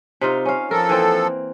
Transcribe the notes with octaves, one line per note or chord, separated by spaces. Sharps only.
C3 D#4 F4
C#4 F5
F3 A4 A#4
E3 A#3 C4